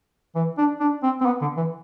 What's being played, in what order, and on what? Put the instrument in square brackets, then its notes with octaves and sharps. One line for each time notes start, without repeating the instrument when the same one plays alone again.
[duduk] E3
D4
D4
C4
C4
B3
D3
E3